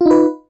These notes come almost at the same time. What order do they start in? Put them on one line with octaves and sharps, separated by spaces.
F4 D#4 B4